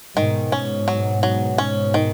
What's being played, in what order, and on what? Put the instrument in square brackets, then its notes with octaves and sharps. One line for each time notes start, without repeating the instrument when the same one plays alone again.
[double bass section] G#2 B2 [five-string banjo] D#3
[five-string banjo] C#4
F#3
F#3
C#4
D#3